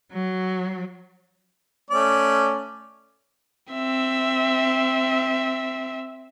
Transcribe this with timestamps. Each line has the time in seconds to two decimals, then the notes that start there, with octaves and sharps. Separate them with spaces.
0.11 F#3
1.90 A3 C#4 D5
3.73 C4 E5